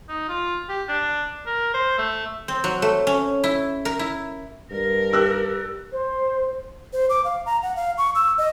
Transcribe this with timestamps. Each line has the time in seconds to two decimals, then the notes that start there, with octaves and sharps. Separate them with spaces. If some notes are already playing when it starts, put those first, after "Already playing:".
0.09 D#4
0.28 F4
0.69 G4
0.88 D4
1.46 A#4
1.74 C5
1.98 A3
2.48 C4
2.64 F#3
2.82 A3
3.07 C#4
3.44 E4
3.85 A#4
3.99 E4
4.71 G2 A#4
5.13 G4 E6 F#6
5.92 C5
6.93 C5
7.10 D6
7.25 F5
7.46 A#5
7.63 F#5
7.76 F5
7.98 C#6
8.15 E6
8.38 D#5